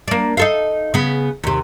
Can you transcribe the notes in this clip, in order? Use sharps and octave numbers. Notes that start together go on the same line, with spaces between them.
A#3 D4
D#4 A4 F5
C#3 B3
D#2 C3